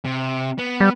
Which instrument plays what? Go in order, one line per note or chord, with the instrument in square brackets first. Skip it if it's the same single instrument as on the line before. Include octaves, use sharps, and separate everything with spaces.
[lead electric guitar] C3
B3
[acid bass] G3